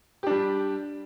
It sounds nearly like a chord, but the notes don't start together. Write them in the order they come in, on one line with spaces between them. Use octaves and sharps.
G4 D4 G3